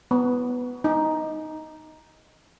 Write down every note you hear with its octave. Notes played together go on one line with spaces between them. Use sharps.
B3
D#4